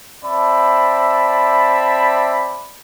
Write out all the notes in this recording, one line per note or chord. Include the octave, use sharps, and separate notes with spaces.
C4 D5 E5 A5 B5